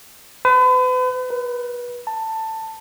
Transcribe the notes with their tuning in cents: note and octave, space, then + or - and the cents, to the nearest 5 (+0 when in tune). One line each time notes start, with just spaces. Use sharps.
B4 +40
B4 -30
A5 +15